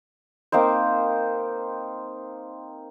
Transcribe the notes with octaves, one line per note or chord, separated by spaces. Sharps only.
A#3 C4 D#4 C5